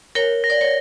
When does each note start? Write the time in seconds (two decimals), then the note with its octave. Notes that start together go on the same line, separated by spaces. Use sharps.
0.15 A#4 C#5 G7
0.44 A#6
0.50 D5
0.61 C#5